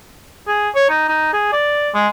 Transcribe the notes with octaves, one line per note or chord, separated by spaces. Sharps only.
G#4
C#5
D#4
D#4
G#4
D5
G#3